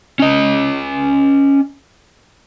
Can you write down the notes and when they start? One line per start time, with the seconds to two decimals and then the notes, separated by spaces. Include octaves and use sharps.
0.19 C#4 D#5